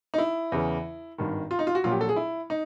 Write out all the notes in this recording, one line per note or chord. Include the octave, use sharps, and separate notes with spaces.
D#4
E4
E2 C#3 E3
G#1 G2 D#3
F4
D#4
F4
F#4
A#1 A#2 F#3 F4
G4
A4
G#4
E4
D#4